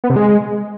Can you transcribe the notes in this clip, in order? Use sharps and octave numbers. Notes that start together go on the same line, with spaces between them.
B3
C3
G#3